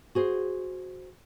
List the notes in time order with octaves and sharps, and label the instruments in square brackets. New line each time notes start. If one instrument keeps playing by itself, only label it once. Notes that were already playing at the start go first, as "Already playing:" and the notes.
[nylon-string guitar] F#4 G#4 C5